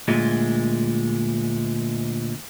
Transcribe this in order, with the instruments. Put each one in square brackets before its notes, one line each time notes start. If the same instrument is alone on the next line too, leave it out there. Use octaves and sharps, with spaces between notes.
[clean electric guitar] D2 A#2 G#3